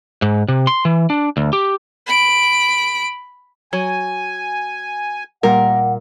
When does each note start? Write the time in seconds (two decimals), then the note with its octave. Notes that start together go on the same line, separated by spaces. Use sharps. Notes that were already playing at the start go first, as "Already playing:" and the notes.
0.22 G#2
0.48 C3
0.67 C6
0.85 E3
1.10 D4
1.37 D2
1.53 G4
2.07 B5 D7
3.73 F#3 G#5
5.43 A#2 G3 A#4 F#5